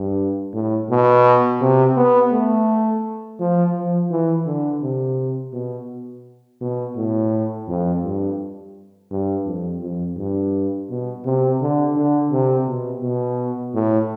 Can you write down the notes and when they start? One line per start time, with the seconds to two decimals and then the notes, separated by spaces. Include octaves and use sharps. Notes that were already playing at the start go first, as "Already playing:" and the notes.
Already playing: G2
0.54 A2
0.90 B2
1.61 C3
1.97 B3
2.32 A3
3.40 F3
3.75 F3
4.11 E3
4.46 D3
4.82 C3
5.53 B2
6.61 B2
6.96 A2
7.68 F2
8.04 G2
9.11 G2
9.46 F2
9.82 F2
10.17 G2
10.90 B2
11.25 C3
11.61 D3
11.96 D3
12.32 C3
12.68 B2
13.03 B2
13.74 A2